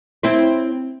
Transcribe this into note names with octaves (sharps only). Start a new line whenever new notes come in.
C4 E4 C5